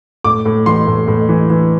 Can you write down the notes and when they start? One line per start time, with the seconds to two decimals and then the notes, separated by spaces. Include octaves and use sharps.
0.24 A2 D6
0.45 A2
0.66 E3 C6
0.87 A2
1.08 A2
1.29 E3
1.50 E3